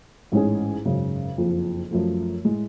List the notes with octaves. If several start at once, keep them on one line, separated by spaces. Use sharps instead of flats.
A1 G#2 G#3 C#4 G#4
G#1 F#2 C#3
F#1 F2 F3
F#2 F3 A3
A2 G#3